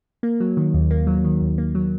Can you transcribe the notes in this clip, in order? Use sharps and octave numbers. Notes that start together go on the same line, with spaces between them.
A#3
F#3
D#3
D#2
A#3
F#3
D#3
D#2
A#3
F#3